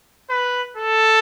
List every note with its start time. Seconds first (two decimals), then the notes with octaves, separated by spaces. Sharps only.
0.30 B4
0.76 A4